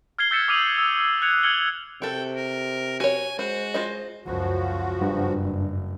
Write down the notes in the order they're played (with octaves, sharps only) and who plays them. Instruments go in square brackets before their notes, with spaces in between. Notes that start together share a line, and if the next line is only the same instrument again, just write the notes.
[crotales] F6 G#6 C7 G7
E6 G6 A6 B6 C#7 E7
D6 D#6 F6 D#7 F7 F#7
E6
F#6 G#6 C#7 F7
F6 G#6 C#7 F#7 G7
[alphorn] C3 [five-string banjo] F#4 A4 [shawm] G5
[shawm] A#4
[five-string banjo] F#4 C#5 [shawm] G#5
[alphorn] G#3 [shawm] F#4 [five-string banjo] C5
[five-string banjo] F4 C5 D#5
[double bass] C#2 F#2 [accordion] F3 F#4
[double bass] F#1 [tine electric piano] G2